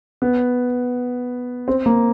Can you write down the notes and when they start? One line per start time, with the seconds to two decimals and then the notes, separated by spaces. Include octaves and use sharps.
0.22 B3
1.68 C4
1.86 A#3